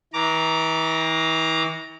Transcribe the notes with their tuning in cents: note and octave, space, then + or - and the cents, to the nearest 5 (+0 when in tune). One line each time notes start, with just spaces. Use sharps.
E3 -40 A#5 +0 D6 +0